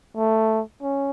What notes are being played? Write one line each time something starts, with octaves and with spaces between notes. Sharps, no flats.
A3
C#4